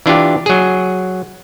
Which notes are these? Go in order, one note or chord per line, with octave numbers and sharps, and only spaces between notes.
E3 D4 F4 G4
F#3 G#4